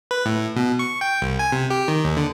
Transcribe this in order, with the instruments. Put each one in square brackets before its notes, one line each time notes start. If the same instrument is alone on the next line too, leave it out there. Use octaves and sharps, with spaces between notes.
[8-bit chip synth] B4
A2
B2
C#6
G5
C2
G#5
C3
G4
D#3
D#2
D3